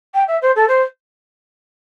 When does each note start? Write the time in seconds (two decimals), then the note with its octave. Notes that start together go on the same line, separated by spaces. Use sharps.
0.14 G5
0.28 E5
0.42 C5
0.55 A4
0.68 C5